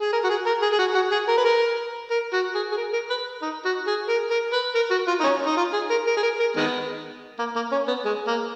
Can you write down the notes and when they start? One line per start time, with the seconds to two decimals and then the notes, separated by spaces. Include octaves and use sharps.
0.01 G#4
0.13 A#4
0.24 F#4
0.29 G#4
0.46 A#4
0.62 G#4
0.73 G#4
0.79 F#4
0.95 F#4
1.12 G#4
1.28 A#4
1.38 B4
1.45 A#4
2.11 A#4
2.33 F#4
2.55 G#4
2.72 G#4
2.77 A#4
2.93 A#4
3.10 B4
3.42 D#4
3.65 F#4
3.87 G#4
4.09 A#4
4.31 A#4
4.53 B4
4.75 A#4
4.91 F#4
5.08 F4
5.21 D#4
5.24 C#4
5.46 D#4
5.57 F4
5.73 G#4
5.90 A#4
6.07 A#4
6.17 G#4
6.23 A#4
6.40 A#4
6.56 D#3 G#3 B3
7.39 A#3
7.56 A#3
7.72 C#4
7.88 B3
8.05 G#3
8.27 A#3